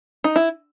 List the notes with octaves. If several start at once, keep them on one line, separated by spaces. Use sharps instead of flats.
D#4
E4